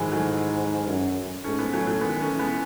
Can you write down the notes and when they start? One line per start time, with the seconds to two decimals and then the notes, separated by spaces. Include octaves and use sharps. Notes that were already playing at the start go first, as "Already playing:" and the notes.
Already playing: G#2 D#3 E3 F#3 G#3
0.11 F#3 A3
0.87 F#2
1.44 G#2 A3 C#4
1.59 G#3 B3
1.73 A2 F#3 A3
1.87 F#3 A3
2.01 D#3 G#3 B3
2.20 A3 C#4
2.30 E3
2.39 G#3 B3